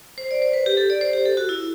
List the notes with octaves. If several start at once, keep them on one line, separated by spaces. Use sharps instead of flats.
C5
D5
C5
B4
G4
A4
D5
C5
G4
A4
F#4
E4